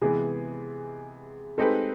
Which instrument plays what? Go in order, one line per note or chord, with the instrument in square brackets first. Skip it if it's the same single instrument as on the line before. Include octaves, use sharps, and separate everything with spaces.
[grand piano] C3 E3 G#3 B3 [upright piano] G#4
[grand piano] G#3 C4 D#4 G4 B4 [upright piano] A4